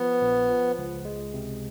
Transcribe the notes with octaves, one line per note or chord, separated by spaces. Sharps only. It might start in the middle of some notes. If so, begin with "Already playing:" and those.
Already playing: F3 B3
A#1
F3
C#2
G#3
C3